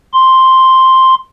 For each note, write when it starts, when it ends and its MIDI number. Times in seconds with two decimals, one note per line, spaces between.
0.14 1.15 84